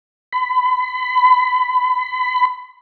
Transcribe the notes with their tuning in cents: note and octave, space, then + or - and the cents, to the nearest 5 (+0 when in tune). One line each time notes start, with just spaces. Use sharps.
B5 +30